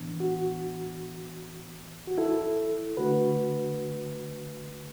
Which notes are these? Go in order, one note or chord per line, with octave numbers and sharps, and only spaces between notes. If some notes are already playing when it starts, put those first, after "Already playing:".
Already playing: A2 E3 B3 D4
F#4
F#4
E4 A4
D3 A3 D4 F#4 B4